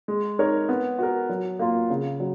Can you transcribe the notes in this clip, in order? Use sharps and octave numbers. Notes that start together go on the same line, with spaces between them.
G#3
D#4 A#4 C#5
B3
F#4 A#4
F#3
A#3 F4
C#3
F#3